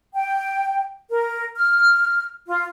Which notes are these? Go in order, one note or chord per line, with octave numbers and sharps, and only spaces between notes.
G5
A#4
F6
F4